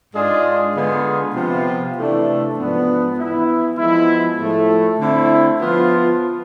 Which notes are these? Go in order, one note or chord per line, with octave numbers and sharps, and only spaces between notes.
G#2 G#3 D4 F4 G#4
D3 G#3 B3 F4 G#4
C3 F3 B3 F4
C3 E3 A3 D4
G#2 F3 B3 D4
E3 B3 E4
F3 G#3 B3 E4
A2 F3 A3
D3 A3 C4 E4
F3 B3 F4